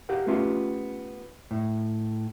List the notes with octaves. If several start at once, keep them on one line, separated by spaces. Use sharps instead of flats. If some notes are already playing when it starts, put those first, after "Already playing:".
G4 A#4 F5 F#5
A3 B3 C#4 F4 G4
A2